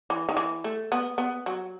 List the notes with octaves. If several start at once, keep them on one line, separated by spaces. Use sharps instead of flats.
E3
D#3
E3
A3
B3
B3
F#3